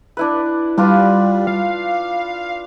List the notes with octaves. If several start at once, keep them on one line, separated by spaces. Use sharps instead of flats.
D4 E4 B4
G3 D4 F4 B4
F5